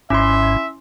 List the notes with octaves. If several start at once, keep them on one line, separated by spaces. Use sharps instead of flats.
G#1 G#2 C#4 E4 E5 C6